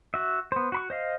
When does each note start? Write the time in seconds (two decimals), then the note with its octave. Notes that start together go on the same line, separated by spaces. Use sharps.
0.14 F#4 E5
0.52 B3 C5
0.72 F#4 B5 C#6
0.90 C5 D#5 F5